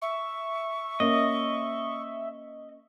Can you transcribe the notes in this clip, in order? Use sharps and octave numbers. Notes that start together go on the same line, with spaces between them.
E5 C#6
A#3 C#4 D#5